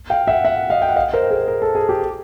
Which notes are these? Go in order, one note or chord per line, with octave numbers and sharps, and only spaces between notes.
F5 G5
E5 F#5
E5 F#5
D#5 F5
G5
F#5
D#5 F5
A#4 C5
G#4 A#4
A#4
A4
G#4
G4 A4